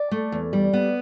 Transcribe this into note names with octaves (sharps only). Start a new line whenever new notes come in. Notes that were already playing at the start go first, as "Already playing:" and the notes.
Already playing: D5
A3
E2
G3
B3